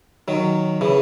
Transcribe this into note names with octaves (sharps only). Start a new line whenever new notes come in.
D#3 F#3
C#3 E3